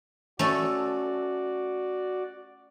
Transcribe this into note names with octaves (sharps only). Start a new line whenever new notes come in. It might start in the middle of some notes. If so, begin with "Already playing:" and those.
A3 C#4 F#4 A4 D5